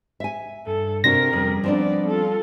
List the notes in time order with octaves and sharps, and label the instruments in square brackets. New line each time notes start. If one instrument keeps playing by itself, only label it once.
[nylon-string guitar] E5 G#5
[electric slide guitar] G2 [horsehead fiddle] A4
[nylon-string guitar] C3 D4 F#4 [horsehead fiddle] C4 A#4 [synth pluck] A#6
[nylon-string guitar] F2 [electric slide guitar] G3 C#4 G#4
[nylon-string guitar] F3 C4 D4 [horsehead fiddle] B3 D5
[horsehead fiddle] F4 A4